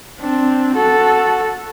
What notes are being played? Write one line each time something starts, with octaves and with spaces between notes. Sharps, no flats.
C4 D4
F#4 A4